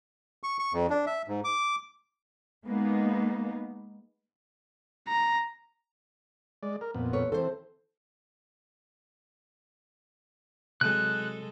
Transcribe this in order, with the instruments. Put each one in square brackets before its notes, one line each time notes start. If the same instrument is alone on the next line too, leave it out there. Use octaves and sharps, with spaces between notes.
[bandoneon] C#6
C#6
F2
D4
E5
G#2
D6
[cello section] G#3 A#3 B3 D#4
[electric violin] A#5
[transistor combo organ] G#3 D5
A#4
F2 A#2 B3
[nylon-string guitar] A4 B4 C#5
[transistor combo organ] E3 C4 [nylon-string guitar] A4 C5
[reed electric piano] C3 F#3 [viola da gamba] G#3 A4 [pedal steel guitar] F#6